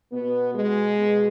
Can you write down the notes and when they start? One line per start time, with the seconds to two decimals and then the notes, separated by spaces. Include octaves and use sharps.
0.12 B2 B3
0.54 B2 G#3
0.98 B2